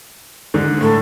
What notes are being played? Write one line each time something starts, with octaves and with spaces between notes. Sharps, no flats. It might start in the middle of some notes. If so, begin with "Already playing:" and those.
G#2 D3
A2 A4